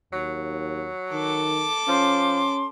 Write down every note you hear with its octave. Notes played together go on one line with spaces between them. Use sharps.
D#2 F#3
D#3 A4 D6
F3 C#4 C6